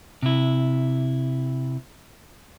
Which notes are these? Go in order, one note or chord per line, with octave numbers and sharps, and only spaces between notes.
C3 E4